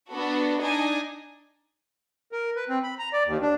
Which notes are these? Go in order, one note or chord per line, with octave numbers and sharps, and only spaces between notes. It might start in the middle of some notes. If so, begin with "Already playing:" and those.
B3 D4 F#4 A4
D4 D#4 D#5 G#5
A#4
B4
C4
B5
A#5
D5
D#2
D4